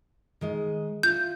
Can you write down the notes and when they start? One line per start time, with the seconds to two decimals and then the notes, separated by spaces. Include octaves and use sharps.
0.41 D#3 G#3 D#5
1.03 F4 E5 G6